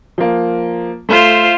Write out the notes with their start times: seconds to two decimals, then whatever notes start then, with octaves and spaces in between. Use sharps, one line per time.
0.18 F3 A#3
1.09 A3 F4 C5 E5